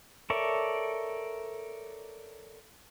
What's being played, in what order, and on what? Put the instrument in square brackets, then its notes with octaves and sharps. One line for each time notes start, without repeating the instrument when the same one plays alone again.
[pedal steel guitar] A4 A#4 C#5 D5 E5